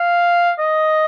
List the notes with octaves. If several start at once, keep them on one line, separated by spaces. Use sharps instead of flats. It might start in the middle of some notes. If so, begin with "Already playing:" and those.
Already playing: F5
D#5